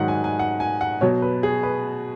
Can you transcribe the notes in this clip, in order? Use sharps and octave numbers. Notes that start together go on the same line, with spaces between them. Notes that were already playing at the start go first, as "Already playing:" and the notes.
Already playing: G#2 D#3 F#3 F#5
G#5
G#5
F#5
G#5
F#5
B2 F#3 C#5
B4
G#4
B4